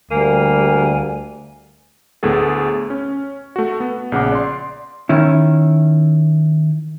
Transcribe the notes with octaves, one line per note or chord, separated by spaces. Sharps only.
D2 G3 A#3 G#5
D2 A2 B3 G#4 A4
C#4
A3 F#4
B3
A#1 C#3 F#5 D6
D5 C6
D#3 C#4 E4